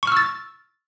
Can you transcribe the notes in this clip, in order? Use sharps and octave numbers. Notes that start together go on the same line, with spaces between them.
C#6 E6 F6 A6